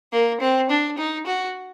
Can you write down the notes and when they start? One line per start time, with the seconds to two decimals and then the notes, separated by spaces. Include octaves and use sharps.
0.13 A#3
0.40 C4
0.70 D4
0.98 D#4
1.27 F#4